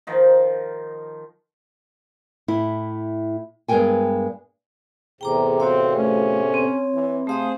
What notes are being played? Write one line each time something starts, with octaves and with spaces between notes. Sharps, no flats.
D#3 F3 D#4
A2 E4
G2 G#3 B3 A#4 G5 G#5
E2 A2 C3 G#4 G5 A#5 D6
C4 F#4 C#5 F5
A3 C#4
C4 C#5
E3
C3 A3 C4 G#4 C5 F5 D#6